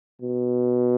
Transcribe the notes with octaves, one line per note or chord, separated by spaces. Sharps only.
B2